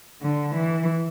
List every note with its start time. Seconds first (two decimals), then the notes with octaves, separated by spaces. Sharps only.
0.22 D3
0.55 E3